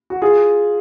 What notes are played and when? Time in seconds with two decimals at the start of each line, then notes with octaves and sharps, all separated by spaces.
0.10 F#4
0.22 F4 G#4